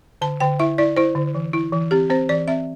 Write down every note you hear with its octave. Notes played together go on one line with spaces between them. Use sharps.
D3 A5
D3 G5
E4 E5
E4 D5
E4 C5
D3
E3
E4
E3
C4 G4
C4 C5
E3 D5
C4 E5